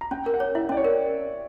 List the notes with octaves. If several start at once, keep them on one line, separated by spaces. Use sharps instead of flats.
A#5
C#4 G5
A#4
F#5
C#5
E4 E5
C#4 D5
C#5
A#4